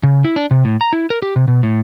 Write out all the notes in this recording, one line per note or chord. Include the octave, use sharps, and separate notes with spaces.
C#3
E4
D4
C3
A2
A#5
E4
A#4
G4
C3
B2
A2